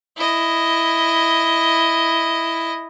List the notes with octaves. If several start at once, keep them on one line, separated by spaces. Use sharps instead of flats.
E4 D#5